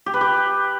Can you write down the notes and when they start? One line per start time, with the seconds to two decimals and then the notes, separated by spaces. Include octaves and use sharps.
0.06 G4
0.14 B4
0.21 G4